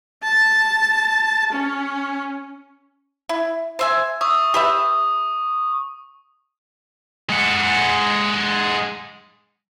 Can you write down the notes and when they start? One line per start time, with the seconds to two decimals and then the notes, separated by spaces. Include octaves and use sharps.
0.24 A5
1.52 C#4
3.29 E4
3.79 C5 E5 G#5
4.21 E5 C#6 D#6
4.54 G4 B4 E5
7.30 G#3 F#5